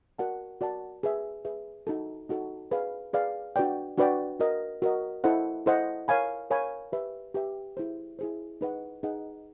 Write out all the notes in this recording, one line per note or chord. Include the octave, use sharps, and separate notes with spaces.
F#4 A#4 D5 F#5 A5
F#4 A#4 D5 F#5 A5
G#4 B4 E5
G#4 B4 E5
D#4 F#4 A4
D#4 F#4 A4
G#4 B4 D5 F5
G#4 B4 D5 F5
D4 F#4 B4 D5 G5
D4 F#4 B4 D5 G5
F#4 A#4 D#5
F#4 A#4 D#5
E4 A4 C5 D#5 F#5
E4 A4 C5 D#5 F#5
A#4 C#5 F5 G#5 B5
A#4 C#5 F5 G#5 B5
G4 B4 E5
G4 B4 E5
E4 G#4 C5
E4 G#4 C5
D#4 G#4 B4 D#5 F#5
D#4 G#4 B4 D#5 F#5